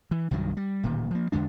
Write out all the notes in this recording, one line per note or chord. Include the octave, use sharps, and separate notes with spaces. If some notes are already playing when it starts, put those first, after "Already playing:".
E3
C2 G2 D#3 F#3
G3
D1 A#2 D#3
F3 A#3
E2 D3 G#3 D4